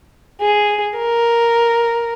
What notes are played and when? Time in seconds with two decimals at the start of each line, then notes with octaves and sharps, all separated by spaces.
0.41 G#4
0.99 A#4